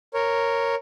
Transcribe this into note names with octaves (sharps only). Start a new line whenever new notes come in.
A#4 C#5